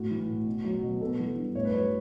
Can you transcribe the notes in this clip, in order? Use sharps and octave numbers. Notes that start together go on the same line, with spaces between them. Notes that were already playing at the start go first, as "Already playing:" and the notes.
Already playing: A2 F#4
E3
A2
B2
F#3
B2
B3 A4
E3
G2
A2 C#5
B4
F#3 C#5